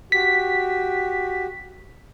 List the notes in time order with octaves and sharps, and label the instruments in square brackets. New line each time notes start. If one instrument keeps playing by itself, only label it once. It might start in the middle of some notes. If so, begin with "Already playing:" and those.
[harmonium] F#4 G4 [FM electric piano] B6